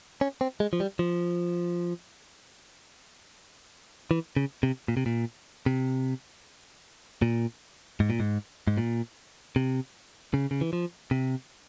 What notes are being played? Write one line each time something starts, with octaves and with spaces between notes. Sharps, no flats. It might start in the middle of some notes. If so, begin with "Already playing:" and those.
C#4
C4
G#3
F3
G3
F3
E3
C#3
C3
A#2
C3
A#2
C3
A#2
G#2
A#2
G#2
G#2
A#2
C3
C#3
C#3
E3
F3
C3